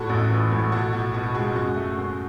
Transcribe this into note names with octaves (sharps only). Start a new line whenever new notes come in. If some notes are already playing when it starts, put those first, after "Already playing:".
Already playing: E2 A2 F#4 A4
A1
E3
A2
B1 F#4 A4
B1 F#4
B2 F#4
G#3 F#4
F#2 F#4
A3
F#2